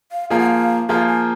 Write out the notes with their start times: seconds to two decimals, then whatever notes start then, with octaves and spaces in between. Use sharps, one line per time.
0.12 F5
0.30 F3 A#3 F4 G#4 F5
0.39 F#5
0.46 F5
0.89 F3 A#3 F4 G#4 F5
1.08 G#5